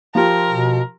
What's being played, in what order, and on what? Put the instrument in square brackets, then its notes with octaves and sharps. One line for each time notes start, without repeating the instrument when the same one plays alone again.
[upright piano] F3 F4 G4 [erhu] A#4
[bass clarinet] B2